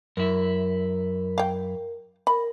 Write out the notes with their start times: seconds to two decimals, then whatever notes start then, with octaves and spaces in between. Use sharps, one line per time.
0.17 F#2 E4 A#4
1.38 F5 G5
2.27 A#4 B5